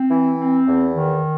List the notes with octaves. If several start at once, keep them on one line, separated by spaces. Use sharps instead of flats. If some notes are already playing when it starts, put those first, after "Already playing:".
Already playing: C4
E3
C4
E2
D#3